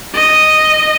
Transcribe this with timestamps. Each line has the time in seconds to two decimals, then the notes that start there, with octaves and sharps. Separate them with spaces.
0.15 D#5